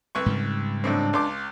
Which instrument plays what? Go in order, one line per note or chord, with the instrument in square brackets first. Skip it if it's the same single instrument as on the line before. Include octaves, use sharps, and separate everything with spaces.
[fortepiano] C2 B4 C#6
[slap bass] G#2 C#3 G3
[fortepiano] B1 A2 C4 [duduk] D4
[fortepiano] C#2 C6 D6